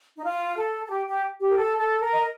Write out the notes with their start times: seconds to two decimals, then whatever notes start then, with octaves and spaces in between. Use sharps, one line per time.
0.16 D#4
0.24 F4
0.56 A4
0.86 A4
0.90 G4
1.07 G4
1.40 G4
1.50 A#4
1.57 A4
1.78 A4
2.01 A#4
2.13 D#5